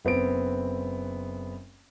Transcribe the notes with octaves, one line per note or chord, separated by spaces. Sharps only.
F#1 B3 C4 D7